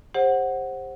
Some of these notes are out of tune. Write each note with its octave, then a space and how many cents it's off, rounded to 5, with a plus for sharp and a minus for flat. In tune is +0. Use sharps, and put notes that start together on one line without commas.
G4 +30 C5 +20 F#5 +0